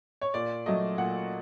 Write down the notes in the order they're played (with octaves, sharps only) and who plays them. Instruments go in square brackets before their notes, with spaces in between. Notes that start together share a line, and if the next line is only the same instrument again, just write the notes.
[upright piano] C#5
A#2 D5
F#3 A3 D#5
A#2 F#5